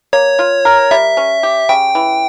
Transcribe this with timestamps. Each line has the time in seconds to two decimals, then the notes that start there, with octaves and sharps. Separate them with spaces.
0.13 A#3 C#5
0.39 F4
0.65 A#4
0.91 G3 E5
1.17 C#4
1.43 G4
1.69 C#3 G5
1.95 E3